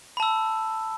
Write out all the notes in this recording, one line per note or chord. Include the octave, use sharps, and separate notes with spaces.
A5 B5 E6